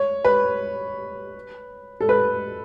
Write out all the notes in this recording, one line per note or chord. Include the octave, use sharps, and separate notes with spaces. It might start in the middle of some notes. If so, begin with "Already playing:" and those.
Already playing: C#5
B4
A4
B4